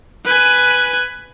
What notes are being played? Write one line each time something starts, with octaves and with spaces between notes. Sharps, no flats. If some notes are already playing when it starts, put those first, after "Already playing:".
B4 G#5